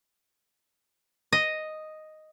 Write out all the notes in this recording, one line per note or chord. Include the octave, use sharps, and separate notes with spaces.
D#5